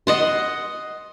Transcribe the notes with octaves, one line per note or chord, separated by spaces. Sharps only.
D#5 F#5 C6